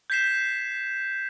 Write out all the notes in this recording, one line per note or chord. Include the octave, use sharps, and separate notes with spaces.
G6 G#6 B6 C7 E7